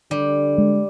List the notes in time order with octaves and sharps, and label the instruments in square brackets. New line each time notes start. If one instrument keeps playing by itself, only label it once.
[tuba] D3 [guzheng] G3
[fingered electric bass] G#3